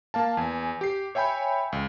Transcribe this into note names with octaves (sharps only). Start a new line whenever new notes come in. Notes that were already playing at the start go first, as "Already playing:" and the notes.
A#3 F5 A5
E2 G#5
G4 C7
C#5 E5 G5 G#5 B5 G6
C#2